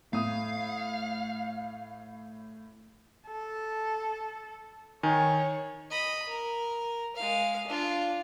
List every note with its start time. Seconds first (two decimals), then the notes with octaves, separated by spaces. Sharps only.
0.13 A2 F5 D#6
3.27 A4
5.03 D#3 C#5 G#5
5.90 D#5 B5
6.28 A#4
7.16 G#3 F5
7.67 D4 F4